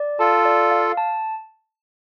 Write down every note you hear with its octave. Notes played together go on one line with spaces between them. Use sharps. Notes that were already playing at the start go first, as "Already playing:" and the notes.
Already playing: D5
F4 A4 A5
D5
F5
A5